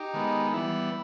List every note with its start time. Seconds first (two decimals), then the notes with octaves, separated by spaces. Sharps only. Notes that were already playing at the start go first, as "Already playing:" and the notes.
Already playing: D#4 G4
0.14 D#3 G#3 B3
0.54 E3 G3 B3 E4